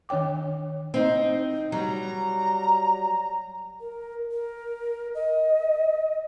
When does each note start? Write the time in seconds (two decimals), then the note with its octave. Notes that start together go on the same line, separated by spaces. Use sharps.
0.09 D#3 D4 C#5 G5 D6
0.94 C4 D#4
1.72 F#3 G3 A#5
3.81 A#4
4.32 A#4
5.15 D#5